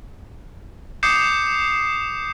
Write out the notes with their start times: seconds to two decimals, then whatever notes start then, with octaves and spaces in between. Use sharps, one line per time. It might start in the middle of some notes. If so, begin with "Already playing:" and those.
1.03 D6 D#6 G6 C7 C#7 E7